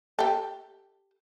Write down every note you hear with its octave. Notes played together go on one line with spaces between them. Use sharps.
G4 A4